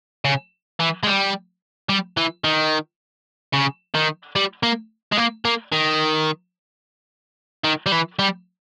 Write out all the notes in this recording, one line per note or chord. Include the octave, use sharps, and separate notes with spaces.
C#3
E3
G#3
G3
G3
E3
D#3
C#3
D#3
G3
A#3
G#3
A#3
A#3
D#3
D#3
G3
E3
G3